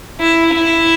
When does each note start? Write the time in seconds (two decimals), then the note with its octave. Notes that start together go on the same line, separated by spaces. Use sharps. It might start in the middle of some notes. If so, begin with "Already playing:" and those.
0.20 E4
0.54 E4